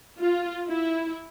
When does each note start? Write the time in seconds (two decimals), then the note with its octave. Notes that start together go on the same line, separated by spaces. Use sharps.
0.19 F4
0.69 E4